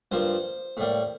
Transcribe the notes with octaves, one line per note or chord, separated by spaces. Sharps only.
G2 F3 A#3 C5
A2 G3 A#3